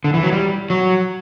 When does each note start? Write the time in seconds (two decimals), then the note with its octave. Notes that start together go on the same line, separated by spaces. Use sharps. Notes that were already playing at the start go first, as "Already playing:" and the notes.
0.04 D3
0.14 E3
0.23 F#3
0.33 G3
0.70 F#3